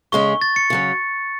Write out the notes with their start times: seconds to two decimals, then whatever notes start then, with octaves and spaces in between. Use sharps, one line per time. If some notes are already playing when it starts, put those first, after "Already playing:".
0.12 C#3 G#3 C#4 C#6
0.41 A6
0.56 C#7
0.70 C#3 F#3 C#4